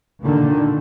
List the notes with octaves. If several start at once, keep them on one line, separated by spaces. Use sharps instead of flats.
A#2 D3 D#3